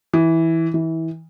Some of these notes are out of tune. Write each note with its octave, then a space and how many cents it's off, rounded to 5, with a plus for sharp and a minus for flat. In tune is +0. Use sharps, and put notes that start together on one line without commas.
E3 -10
E3 -25